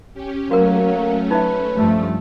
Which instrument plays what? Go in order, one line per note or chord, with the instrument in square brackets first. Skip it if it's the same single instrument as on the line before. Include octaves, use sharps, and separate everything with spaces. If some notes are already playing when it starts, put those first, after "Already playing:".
[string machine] C#4 G4
[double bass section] F#3 [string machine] A3 C#4 [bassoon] A#3 [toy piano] F#4 A#4
[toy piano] D#4 E5 [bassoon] B4
[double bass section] G2 F3 A3